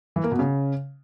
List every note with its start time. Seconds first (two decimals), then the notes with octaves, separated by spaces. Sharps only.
0.16 E3
0.24 A#3
0.31 B2
0.39 C#3